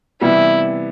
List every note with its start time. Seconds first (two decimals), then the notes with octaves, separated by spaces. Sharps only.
0.21 C3 E3 G3 B3 E4